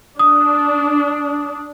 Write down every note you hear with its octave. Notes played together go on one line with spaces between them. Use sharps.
D4 D#6